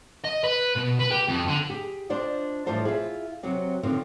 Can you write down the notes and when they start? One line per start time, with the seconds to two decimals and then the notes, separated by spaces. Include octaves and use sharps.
0.24 D#5
0.44 B4
0.76 B2
0.99 B4
1.11 G4
1.28 F2
1.47 D3
1.70 G4 G#4
2.10 D4 F4 C5 D5 D#5
2.66 A2 E3 F3 G3 C5 A5
2.85 E4 F4 G#4
3.43 C3 F#3 C4
3.83 D3 D#3 F3 C4